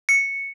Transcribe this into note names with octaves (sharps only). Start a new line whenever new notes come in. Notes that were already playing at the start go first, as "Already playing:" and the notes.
C#7